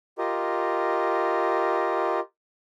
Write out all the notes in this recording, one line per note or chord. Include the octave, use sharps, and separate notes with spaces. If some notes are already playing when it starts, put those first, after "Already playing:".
F4 G4 A#4 D#5